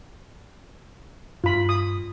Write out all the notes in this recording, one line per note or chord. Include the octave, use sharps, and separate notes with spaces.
G2 F4 B5
D#6